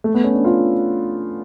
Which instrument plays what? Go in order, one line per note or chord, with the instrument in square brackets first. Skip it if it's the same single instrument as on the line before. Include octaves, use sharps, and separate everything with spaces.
[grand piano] A3
B3
C#4
D4
F4